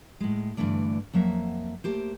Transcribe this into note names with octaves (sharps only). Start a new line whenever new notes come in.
A2 G#3
G2 B2 D3 E3 A3 D5
F2 F#3 A#3 E5 F#5
A3 A#3 G4 C5